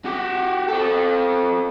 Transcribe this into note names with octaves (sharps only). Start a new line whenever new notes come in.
F#4 G4
C4 A4